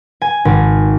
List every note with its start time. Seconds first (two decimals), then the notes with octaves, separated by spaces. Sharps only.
0.22 G#5
0.45 G#1